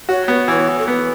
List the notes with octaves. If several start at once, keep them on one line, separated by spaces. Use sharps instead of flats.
F#4 C#5
B3
E3 C#5
E3
A4
B3 B4